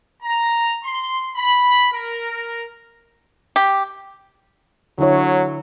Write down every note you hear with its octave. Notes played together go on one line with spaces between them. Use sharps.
A#5
C6
B5
A#4
G4
D3 F#3 E4 C#5